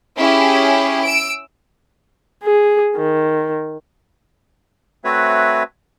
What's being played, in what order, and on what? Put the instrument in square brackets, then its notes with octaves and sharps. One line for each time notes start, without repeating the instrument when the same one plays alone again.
[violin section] C#4 E4 G4 G#4
E6 D7
[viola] G#4
D#3
[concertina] A3 C4 F#4 B4 C#5 E5